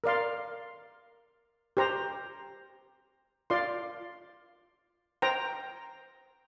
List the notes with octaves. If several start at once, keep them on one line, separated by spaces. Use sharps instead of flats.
A#4 D5 F5 C6
G4 C5 A#5
F4 D5 F5 C6
C5 G5 A#5